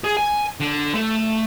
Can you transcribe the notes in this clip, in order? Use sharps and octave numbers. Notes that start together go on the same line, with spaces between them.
G#4
G#5
D3
A3